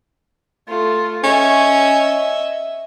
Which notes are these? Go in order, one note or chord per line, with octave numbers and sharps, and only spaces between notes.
A3 F4
C#4 D#5 E5